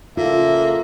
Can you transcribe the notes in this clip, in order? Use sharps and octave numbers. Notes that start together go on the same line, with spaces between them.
A#2 C#3 A#3 F4 A4 E5